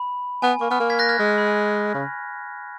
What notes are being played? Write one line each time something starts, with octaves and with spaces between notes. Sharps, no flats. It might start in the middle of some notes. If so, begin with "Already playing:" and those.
Already playing: B5
B3 G#5
A#3 C#6
B3 F6
A#3
G#6 B6
F#6 A#6
F6 G#6
G#3 F#6
F6
B5
G#5
C#3